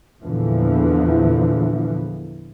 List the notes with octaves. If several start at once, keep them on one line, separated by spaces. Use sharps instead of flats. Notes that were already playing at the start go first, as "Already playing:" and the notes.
E2 A#2 D3 E3 F3